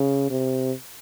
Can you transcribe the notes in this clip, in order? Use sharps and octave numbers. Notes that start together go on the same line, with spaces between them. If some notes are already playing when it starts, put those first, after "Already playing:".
Already playing: C#3
C3